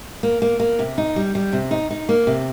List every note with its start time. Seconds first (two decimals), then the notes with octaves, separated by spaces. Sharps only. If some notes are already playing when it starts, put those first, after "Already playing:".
0.23 A#3
0.42 A#3
0.59 A#3
0.79 C3
0.98 D#4
1.16 G3
1.35 G3
1.53 C3
1.71 D#4
1.90 D#4
2.09 A#3
2.27 C3